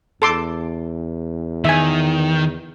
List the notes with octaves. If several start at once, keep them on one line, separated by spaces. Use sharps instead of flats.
E2 A4 C6 D6
D#3 E5 G#5